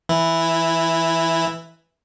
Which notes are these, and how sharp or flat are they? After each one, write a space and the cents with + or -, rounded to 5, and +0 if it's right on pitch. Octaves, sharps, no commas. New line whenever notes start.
E3 +0 E4 +0